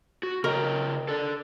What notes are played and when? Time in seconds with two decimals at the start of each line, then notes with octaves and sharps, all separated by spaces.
0.23 F#4
0.44 C#3 A#4 D#5 G5
1.08 A4 D5